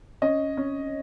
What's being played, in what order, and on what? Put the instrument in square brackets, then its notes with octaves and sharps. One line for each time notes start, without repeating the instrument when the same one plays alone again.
[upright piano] C#4 D#5
C#4